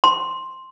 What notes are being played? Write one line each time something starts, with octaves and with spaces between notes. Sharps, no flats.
C6